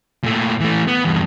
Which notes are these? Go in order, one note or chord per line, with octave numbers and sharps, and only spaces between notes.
A#2 A3
E3 A3
B3
E2 G2